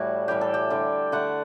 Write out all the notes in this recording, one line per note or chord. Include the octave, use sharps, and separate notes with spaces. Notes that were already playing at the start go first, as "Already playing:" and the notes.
Already playing: A2 E3 G3 A3 E4 F#4
A2 E3 G3 G4
A4
G4
D3 G3
D3 A3 F#5